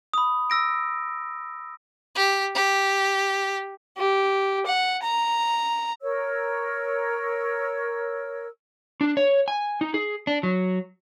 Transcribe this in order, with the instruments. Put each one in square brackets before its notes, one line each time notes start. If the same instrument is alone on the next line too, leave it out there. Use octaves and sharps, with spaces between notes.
[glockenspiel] B5 D#6
E6 A#6 D7
[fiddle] G4
G4
G4
F#5
A#5
[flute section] A#4 C#5 E6
[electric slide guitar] D4
C#5
G#5
D#4
G#4
D4
F#3